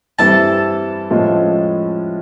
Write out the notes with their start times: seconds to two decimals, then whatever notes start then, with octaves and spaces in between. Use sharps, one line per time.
0.18 G2 E3 G3 C4 E4 A4 A5
1.11 A2 F3 G#3 C#4 F4